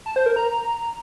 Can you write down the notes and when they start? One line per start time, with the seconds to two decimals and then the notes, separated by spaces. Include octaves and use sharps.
0.06 A5
0.16 C5
0.26 A#4
0.36 A#5